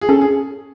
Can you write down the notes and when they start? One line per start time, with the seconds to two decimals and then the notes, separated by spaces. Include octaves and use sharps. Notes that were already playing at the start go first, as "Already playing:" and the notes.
0.01 G#4
0.09 C#4 A4
0.21 G#4